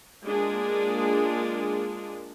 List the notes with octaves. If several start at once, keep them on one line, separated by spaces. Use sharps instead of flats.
G#3 A#3 D4 F4 G#4